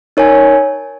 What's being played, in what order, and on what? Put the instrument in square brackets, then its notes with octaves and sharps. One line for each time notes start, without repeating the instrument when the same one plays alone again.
[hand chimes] D#4 A#4 C#5 G#5